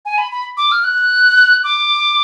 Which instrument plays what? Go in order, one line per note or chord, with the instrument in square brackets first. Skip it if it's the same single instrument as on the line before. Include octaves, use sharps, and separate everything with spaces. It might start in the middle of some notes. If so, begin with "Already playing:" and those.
[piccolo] G#5
B5
B5
D6
F6
F#6
D6